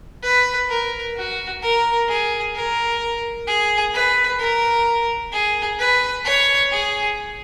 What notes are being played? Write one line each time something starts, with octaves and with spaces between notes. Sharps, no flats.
B4
A#4
F#4
A#4
G#4
A#4
G#4
B4
A#4
G#4
B4
C#5
G#4